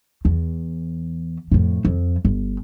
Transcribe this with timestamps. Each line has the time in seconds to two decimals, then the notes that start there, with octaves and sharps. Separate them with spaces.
0.25 E2
1.51 F2 A2
1.85 F2
2.25 G1